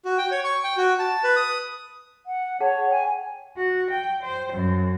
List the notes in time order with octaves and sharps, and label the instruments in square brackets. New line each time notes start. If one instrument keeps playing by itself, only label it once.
[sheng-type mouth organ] F#4
G5
C#5
C#6
G5
F#4
A5
B4
D#6
[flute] F#5
[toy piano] G#4 F#5 A5 [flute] C#5
[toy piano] G5 [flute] G#5
[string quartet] F#4
G5
C5
F#2